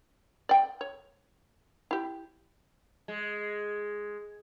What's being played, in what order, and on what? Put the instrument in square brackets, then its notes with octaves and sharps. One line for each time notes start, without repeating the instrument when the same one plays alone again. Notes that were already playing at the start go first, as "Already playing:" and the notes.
[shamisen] D5 G5
C#5
E4 G4
[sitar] G#3